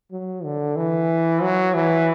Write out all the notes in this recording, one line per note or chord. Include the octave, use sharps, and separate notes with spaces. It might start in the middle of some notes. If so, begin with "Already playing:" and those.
F#3
D3
E3
F#3
E3